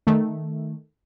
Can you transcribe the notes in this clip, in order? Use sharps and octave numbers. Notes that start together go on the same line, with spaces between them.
D#3 A3